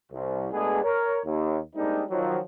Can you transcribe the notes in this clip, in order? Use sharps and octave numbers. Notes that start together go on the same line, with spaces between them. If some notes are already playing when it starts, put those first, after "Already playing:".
C2
B2 G#3 A3 B3 D4 G#4
A#4 C#5
D#2
G3 G#3 A#3 C4 D4 D#4
D#3 F3 F#3